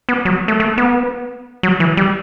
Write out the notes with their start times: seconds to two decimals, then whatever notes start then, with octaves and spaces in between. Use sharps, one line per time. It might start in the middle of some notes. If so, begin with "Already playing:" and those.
0.09 B3
0.25 F#3
0.48 A3
0.60 A3
0.78 B3
1.63 F#3
1.80 E3
1.97 G3